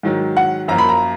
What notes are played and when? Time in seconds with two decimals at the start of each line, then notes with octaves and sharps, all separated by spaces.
0.03 G#2 D#3 F#3
0.37 F#5
0.68 F#2 F3 A#3 A#5
0.78 B5
0.89 A#5